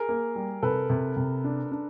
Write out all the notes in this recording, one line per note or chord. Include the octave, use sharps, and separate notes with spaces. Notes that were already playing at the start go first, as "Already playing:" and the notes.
Already playing: G#4 A#4
A#3
G3
C3 A4 B4
C3
C3
D4
D4